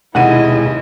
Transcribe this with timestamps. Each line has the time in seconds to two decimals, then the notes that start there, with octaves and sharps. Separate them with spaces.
0.15 F1 D#2 B2 G#3 E4 D#5 F#5 D#7